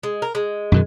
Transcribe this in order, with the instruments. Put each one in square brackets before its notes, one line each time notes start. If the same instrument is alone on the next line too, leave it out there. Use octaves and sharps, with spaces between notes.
[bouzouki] G#3
A#4
G#3
[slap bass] F#2 B2 D#3